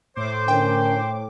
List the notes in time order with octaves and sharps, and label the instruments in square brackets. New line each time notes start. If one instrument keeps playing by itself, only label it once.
[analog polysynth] A2 D6 [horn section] C5
[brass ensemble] D3 C#4 A#4 [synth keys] G5